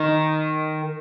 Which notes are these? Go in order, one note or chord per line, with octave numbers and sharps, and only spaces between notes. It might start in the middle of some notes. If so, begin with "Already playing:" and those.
Already playing: D#3